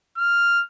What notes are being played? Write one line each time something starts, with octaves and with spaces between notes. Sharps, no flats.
F6